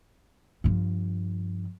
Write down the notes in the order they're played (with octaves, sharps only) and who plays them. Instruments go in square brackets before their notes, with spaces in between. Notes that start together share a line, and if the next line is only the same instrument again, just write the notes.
[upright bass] G2 F3